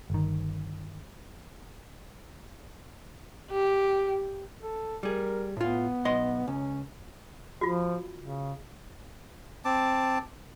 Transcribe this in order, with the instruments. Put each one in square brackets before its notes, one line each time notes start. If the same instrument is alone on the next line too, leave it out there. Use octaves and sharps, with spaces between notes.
[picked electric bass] G1 D#3
[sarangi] G4
[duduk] A4
[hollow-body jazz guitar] G3 G#4 [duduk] A#4
[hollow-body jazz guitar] A2 F4 [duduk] B3
[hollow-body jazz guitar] B1 D#5 C6
[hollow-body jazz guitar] C#2 [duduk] C#4
[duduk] F3 [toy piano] F4 F#4
[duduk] C#3
[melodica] C4 A5 D6